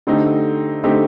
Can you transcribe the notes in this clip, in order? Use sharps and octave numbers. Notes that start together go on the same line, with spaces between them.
D3 A3 C4 D#4 G4
D3 A3 C4 D#4 G4